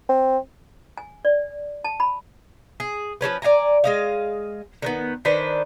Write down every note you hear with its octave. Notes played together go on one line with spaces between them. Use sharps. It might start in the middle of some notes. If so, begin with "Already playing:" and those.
C4
G#5
D5
A5
B5
G#4
F3 F#3 C#4 B4
D5 F5 G#5 A#5
G#3 D#5 F5
D3 D#3 B3
D#3 D4 B4 C5